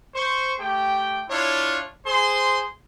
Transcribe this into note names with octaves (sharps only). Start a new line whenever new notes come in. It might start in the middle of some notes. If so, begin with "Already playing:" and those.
C5 C#6
A3 G4 G5
D4 E4 F4 C#5
G#4 C5 C6